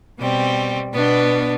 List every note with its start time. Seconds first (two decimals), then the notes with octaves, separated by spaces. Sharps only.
0.18 B2 G3 C4
0.93 B2 B3 D4